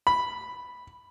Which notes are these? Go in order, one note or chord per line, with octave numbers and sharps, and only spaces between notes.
B5